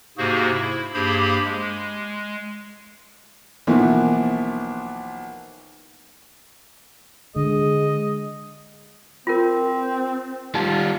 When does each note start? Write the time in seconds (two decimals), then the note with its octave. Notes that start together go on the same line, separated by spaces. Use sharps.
0.18 G#2 C3 A#3 F#4 G#4 C5
0.54 E4
0.94 G2 A#3 G4 G#4 C5 B5
1.45 G#3
3.67 B1 E3 F3 A#3 B3
7.36 D3 G#3 D#5
9.27 C4 F4 A#4
10.55 G3 D#4 F4